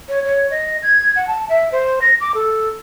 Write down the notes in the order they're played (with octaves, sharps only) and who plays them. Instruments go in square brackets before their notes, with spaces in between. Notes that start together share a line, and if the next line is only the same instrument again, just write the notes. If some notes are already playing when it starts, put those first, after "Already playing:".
[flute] C#5
C#5
D#5
G#6
F#5
A5
E5
C5
A#6
D6
A4